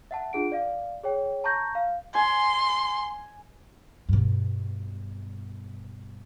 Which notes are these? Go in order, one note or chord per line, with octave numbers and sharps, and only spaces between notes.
E5 F#5 A5
D4 F4 G#4 F#5 D7
D5 F5
G#4 C#5 G5
A5 A#5 C#6 G6 A#6
F5
G#5 C6
G2 B2